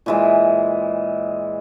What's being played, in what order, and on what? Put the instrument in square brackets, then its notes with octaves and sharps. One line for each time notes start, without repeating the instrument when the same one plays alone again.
[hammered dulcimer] A#2 E3 G#3